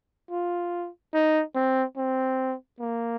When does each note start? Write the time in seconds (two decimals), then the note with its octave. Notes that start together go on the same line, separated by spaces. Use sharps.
0.31 F4
1.14 D#4
1.55 C4
1.97 C4
2.80 A#3